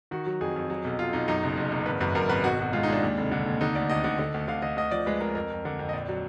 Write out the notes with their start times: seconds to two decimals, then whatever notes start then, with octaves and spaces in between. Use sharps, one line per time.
0.11 D#3 F#4
0.26 F#3
0.41 F2 G#4
0.56 F2
0.70 F#3
0.84 B1
0.98 B1 F4
1.13 B1 D#4
1.28 F#2 D#4
1.43 F#1
1.58 F#1
1.72 F#1
1.86 G#1 B4
2.01 F#2 B4
2.15 F#2 A#4
2.29 G#1 B4
2.44 B1 F#4
2.59 B2 F#4
2.73 G#3 F4
2.83 D#4
2.88 G#3 D4
3.03 D#2
3.18 F1
3.31 D3
3.46 D#2
3.61 D3 D#4
3.75 D2 D5
3.90 D2 D#5
4.04 D3
4.19 D3
4.34 D2
4.48 D3 F5
4.62 D3 D#5
4.77 D2 D#5
4.91 F3 D5
5.06 G#3 B4
5.21 G#3 A#4
5.35 F2 A#4
5.50 F2
5.65 D3
5.79 F2
5.89 D#5
5.93 A#1 D5
6.08 F#3